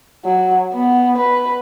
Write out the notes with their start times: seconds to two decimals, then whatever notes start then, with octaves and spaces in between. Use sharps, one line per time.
0.25 F#3
0.74 B3
1.18 B4